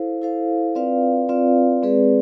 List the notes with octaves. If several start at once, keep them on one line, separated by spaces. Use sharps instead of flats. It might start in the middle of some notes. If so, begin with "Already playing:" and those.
Already playing: E4 A4 C5 F5
E4 A4 C5 F5
C4 F4 B4 D5 F5
C4 F4 B4 D5 F5
G#3 C4 G#4 B4 D5